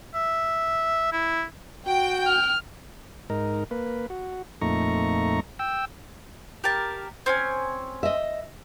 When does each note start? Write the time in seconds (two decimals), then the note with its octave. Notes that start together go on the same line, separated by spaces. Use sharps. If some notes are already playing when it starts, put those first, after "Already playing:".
0.14 E5
1.12 E4
1.87 F#4 G5
2.27 F6
3.30 G#2 D#4 A#4
3.71 A#3 B4
4.10 F#4
4.61 F2 A#2 A3 D#4 A#5 C#6
5.59 G5 E6
6.64 G4 A#4 A5
7.26 C4 C#4 G#5
8.03 D#5 E5